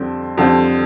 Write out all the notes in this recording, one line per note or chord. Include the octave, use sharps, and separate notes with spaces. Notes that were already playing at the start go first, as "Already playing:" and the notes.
Already playing: F2 D3 G3 C4
F2 D3 G3 C4